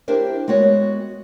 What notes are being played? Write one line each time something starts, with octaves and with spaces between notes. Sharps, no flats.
D4 E4 G4 A#4 C5
G#3 B3 F#4 C#5